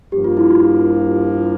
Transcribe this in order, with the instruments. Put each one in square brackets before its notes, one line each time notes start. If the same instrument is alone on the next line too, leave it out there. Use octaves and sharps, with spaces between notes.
[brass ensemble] G2 F3 A#3 [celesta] G4
[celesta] F4
E4
F4